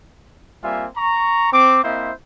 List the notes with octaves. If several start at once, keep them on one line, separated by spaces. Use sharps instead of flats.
G3 A#3 C4 F4 E5 G#5
A#5 C#6
C4 D6
A#3 C4 E4 C5 D#5 E5